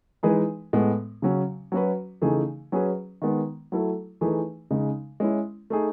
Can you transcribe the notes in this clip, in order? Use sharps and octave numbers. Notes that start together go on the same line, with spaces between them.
E3 G#3 D#4 G#4 B4
A2 G#3 B3
C#3 F#3 C#4
F#3 C#4 F#4 B4
C#3 E3 A3 D#4 G#4
F#3 C#4 G#4 B4
D#3 G#3 B3
F#3 A3 E4 A4
E3 A3 D#4 G#4 B4
C#3 G#3 D#4
G#3 C#4 E4
A3 D#4 G#4